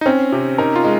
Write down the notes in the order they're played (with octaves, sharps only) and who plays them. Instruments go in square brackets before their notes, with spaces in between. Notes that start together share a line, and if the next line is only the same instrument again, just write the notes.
[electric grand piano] D#4
[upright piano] C4 [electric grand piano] C#4
[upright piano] C3
[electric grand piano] D#4 [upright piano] A#4
[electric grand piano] F4
[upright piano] G#3